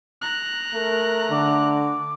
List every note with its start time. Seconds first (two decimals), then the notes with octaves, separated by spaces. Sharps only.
0.22 A#5 F#6
0.74 A3 A#4
1.31 D3 D6